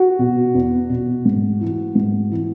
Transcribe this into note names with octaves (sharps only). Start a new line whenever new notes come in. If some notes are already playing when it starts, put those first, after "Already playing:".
Already playing: F#4
B2
E2
B2
G#2
E3
G#2
E3